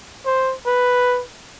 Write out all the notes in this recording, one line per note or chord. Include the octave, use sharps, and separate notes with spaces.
C5
B4